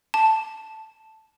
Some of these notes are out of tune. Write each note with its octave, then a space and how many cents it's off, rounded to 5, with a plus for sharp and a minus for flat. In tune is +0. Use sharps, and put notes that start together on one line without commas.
A5 +0